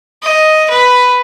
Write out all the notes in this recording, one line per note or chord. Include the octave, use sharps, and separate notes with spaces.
D#5
B4